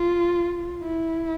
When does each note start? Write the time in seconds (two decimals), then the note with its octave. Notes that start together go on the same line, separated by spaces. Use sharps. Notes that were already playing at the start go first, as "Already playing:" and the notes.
Already playing: F4
0.82 E4